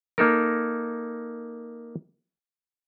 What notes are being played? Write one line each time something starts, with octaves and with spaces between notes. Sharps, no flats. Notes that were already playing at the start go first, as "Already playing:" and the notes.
A#3 D#4 A4 A#4